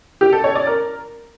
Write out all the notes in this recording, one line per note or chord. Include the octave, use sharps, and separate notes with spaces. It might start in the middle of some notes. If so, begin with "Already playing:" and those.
G4
A4
C#5
D5
A#4